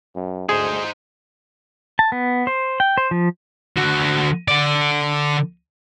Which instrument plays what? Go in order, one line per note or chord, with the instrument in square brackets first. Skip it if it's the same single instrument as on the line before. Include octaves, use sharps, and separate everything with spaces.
[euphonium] F#2
[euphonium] D2 [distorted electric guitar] D#4 C5 [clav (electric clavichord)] G#4
[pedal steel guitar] A5
B3
C5
G5
C5
F3
[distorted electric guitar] D3 F#4
D3 D5